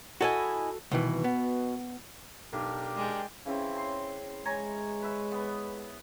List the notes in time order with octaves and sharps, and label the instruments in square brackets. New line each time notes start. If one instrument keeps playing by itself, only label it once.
[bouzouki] E4 D#5 G#5 [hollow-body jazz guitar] F#4 A4
[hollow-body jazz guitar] C2 D#3 E3 [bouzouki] B2
[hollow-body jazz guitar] B3
[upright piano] B1 [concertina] D4 G4 A#4
[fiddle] G#3 [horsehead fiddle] D5 G5
[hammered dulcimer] C#3 E3 C4 [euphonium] C#4
[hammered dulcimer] C6
[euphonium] G#3 [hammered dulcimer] C#5 G#5 A#5
[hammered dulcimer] B4 E5
B3